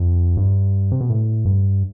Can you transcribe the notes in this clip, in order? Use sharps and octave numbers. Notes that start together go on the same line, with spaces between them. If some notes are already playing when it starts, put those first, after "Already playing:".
Already playing: F2
G2
C3
B2
A2
G2